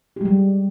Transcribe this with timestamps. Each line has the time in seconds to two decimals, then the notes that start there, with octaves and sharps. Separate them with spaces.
0.16 G4
0.21 G#3
0.25 G3